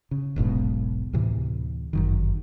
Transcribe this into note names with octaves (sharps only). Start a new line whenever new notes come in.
C#3
E1 B1 G#2 B2
D2 A2 C3 E3
G1 F#2 D#3